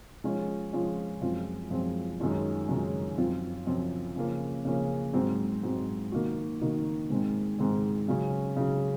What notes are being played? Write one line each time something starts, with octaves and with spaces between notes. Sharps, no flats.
F3 G#3 C#4 F4
F3 G#3 C#4 F4
F#2 F3 G#3 C4 F4
F#2 F3 G#3 C4 F4
F#2 D#3 G#3 C#4 F4
F#2 D#3 G#3 C#4 F4
F#2 F3 C4 F4
F#2 F3 C4 F4
C#3 F3 A#3 C#4
C#3 F3 A#3 C#4
G#2 F#3 C4
G#2 F#3 C4
D#3 A#3 D#4 F#4
D#3 A#3 D#4 F#4
G#2 D#3 G#3 C4
G#2 D#3 G#3 C4
C#3 F#3 C#4
C#3 F#3 C#4